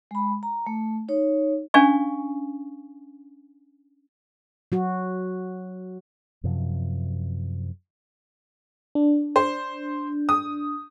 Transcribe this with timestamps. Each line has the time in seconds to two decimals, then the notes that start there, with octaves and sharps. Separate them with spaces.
0.11 G#3 B5
0.43 A#5
0.67 A3
1.09 D#4 C#5
1.74 C#4 D4 F5 G#5 C#6
4.72 F#3 F#4
6.44 F#2 C3 F3
8.95 D4
9.36 C5
10.29 D#6